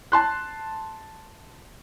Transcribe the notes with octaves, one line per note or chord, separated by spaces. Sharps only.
A5 C6 F#6